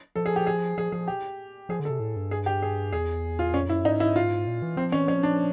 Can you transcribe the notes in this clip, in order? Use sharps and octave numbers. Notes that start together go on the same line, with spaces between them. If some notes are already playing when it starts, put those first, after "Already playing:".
F3 A4
G#4
G4
G#4
F3 G#4
F3 G#4
G4
F3 G#4
D3
C3 A4
A2
G2
G#4
G4
G#4
E2 G#4
F4
F2 C#4
F#2 E4
G#2 D#4
E4
F4
A#2
E3
F3 C4
E3 C#4
F3 C#4
D4